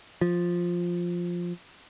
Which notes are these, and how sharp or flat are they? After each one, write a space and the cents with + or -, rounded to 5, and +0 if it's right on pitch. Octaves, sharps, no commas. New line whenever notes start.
F3 +5